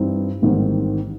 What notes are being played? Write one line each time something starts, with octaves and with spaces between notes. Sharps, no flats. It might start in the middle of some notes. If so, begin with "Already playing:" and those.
Already playing: G2 E3 G3 C4 D#4
A1 G#2 D#3 G3 C4